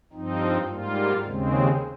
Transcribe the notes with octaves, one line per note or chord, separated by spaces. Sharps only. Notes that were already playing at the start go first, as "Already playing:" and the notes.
G2 F3 C4 D#4
G#2 G3 A#3 F4
D#2 C#3 G#3 C4